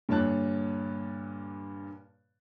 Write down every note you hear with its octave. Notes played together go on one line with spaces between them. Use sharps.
G2 A#2 D3 C#5 A5 F#6